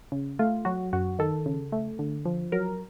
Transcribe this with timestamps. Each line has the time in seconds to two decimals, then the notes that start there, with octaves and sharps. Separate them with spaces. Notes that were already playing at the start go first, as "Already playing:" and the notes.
0.12 C#3
0.39 A3 F4
0.65 F#3 F#4
0.93 F#2 F#4
1.19 D#3 A4
1.46 C#3
1.72 A3
1.99 D3
2.25 F3
2.52 F#3 A#4